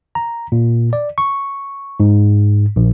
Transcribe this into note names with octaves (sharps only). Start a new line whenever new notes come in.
A#5
A#2
D5
C#6
G#2
A#1